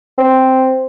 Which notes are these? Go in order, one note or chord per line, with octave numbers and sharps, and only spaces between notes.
C4